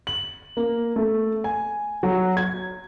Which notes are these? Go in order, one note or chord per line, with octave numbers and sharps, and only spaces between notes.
F#7
A#3
A3
G#5
F#3
G#6